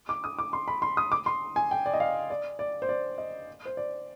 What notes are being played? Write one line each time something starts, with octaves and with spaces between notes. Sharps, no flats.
D6
D#6
D6
C6
B5
C6
D#6
D6
C6
G#5
G5
D5
D#5
F5
D5
D5
C5
D5
D#5
C5
D5